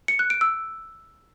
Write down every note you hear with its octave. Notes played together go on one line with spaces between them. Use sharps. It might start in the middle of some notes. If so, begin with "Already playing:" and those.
C#7
F#6
D7
E6